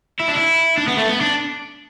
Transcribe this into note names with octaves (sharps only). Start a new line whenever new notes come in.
E4
D4
E4
D4
B3
A3
B3
D4